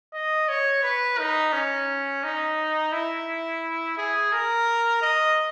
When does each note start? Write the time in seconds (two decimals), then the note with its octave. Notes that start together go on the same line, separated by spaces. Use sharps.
0.14 D#5
0.48 C#5
0.83 B4
1.19 D#4
1.53 C#4
2.23 D#4
2.92 E4
3.97 G#4
4.32 A#4
5.02 D#5